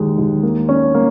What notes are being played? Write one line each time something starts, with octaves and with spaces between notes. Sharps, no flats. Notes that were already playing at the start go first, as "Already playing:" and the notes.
Already playing: D#2 G#3
D#2
A#3
C#4
A#3